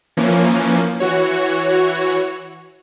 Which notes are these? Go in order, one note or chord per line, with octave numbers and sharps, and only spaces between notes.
E3 F3 A#3 C#4
E3 F#4 C#5